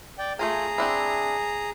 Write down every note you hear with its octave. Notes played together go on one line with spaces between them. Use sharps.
D5 G5
A3 F4 G#4 G#5 A#5
C4 D4 E4